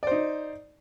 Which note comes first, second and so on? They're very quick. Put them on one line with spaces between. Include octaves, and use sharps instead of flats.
D5 C5 D#4